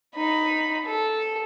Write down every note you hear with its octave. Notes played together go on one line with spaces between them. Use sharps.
D#4 B5
A4